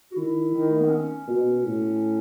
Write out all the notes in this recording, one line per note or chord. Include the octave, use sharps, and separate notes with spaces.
F#4
D#3 E4
D#3
A3
B3
C#4
B2
A2